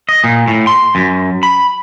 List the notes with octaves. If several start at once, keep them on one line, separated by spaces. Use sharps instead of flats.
D#5
A#2
A2
C6
F#2
B5